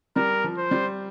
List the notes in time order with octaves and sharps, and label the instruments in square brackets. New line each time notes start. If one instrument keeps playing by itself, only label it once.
[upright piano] G3 [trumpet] A#4
[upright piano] F3
[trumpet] C5
[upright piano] G3